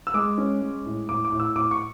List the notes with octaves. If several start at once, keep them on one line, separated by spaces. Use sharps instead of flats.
E6
G#3 D6
C#4
G#3
A2
A2 D6
D6
A2
E6
A2 D6
C#6